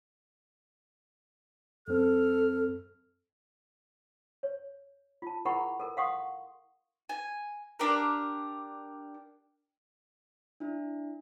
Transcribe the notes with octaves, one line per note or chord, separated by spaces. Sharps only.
F#2 C4 A4 F6
C#5
F4 A5
E4 G#4 A#4 F#5 B5 C#6
A4 A#4
F5 F#5 C6 C#6 D#6
G#5
D4 G4 A#4
D4 E4